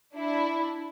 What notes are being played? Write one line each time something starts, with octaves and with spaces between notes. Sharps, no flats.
D4 E4